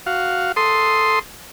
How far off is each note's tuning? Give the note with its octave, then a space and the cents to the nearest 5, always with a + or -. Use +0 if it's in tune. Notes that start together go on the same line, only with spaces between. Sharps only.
F#4 +0 F5 +0
A4 +0 C6 +0 D#6 +0